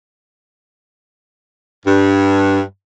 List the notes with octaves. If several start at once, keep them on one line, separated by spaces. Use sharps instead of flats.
G2